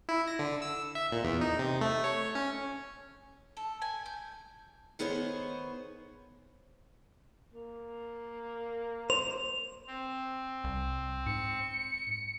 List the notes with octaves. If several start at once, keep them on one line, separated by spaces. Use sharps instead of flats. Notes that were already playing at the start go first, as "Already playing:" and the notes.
E4
A#6
D3
E6
E5
A#2
E2
D#4
C3
A3
C#5
C#4
A4
G#5
G6
D#3 B3 G#4 C5 C#5
A#3
C5 F7
C4
C2
G#2 C#7